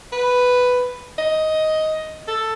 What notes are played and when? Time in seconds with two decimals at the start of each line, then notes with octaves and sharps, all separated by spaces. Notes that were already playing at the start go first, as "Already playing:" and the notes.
0.12 B4
1.19 D#5
2.28 A4